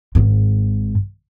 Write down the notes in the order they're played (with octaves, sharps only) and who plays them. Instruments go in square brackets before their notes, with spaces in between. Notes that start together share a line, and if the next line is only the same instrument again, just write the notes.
[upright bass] G#1 G#2